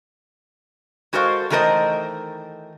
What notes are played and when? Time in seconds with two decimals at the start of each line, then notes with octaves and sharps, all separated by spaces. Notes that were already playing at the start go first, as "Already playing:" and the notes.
1.13 G#3 F#4 A4 A#4 C5 F5
1.50 D#3 E3 A3 A#4 C5 D#5